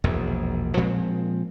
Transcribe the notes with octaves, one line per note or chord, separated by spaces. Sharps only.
E1 A#1 E2
A#2 F3 G#3 C4